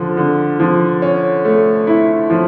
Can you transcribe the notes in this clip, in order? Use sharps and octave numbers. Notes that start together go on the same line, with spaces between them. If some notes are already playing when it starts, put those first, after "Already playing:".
Already playing: D3 F3
D3
F3
C#4
A3
E4
F3